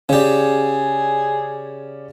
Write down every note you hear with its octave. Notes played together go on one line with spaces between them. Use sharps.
C#3 C#4 G4 G#4 D5